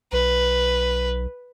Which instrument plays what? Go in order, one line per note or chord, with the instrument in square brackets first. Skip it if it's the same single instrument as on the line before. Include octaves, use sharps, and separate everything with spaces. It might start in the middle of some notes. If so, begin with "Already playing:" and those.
[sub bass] B1 [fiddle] B4